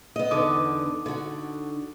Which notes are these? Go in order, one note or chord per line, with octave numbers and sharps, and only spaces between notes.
B3 D#5
E2 D3 B3 D#4 D6 D#6
D3 F#4